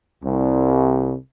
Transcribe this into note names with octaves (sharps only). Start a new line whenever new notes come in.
C2